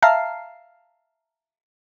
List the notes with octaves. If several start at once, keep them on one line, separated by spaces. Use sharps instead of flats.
E5 F5 A5 A#5 F6 C7